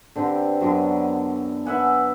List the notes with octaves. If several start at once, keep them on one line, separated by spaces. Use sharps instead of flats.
D3 C4 G4 B4
F#2 D3 B3
B4 E5 F#5 G#5